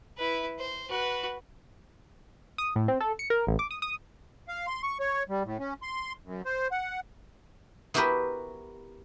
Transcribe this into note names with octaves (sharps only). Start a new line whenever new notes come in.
E4 B4
C5
F#4 B4
D#6
A2
C4
A4
C#7
A#4
A1
D6
D#6
D#6
F5
C6
C#6
C#5
G3
A2
C#4
C6
F#2
C5
F#5
B3 E4 F#4 G4 A#4 B4